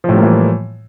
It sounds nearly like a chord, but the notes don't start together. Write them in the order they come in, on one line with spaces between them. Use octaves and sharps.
F3 A2 G3 A#3 E3